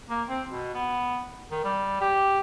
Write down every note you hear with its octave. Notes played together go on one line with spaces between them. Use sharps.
A#3
C4
B2
B3
D#3
G3
G4